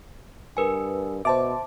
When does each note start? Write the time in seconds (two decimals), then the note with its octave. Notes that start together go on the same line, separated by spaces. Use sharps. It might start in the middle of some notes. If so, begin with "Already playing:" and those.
0.57 G2 A#4 B4 G#5
1.25 B2 C5 E5 A5 D6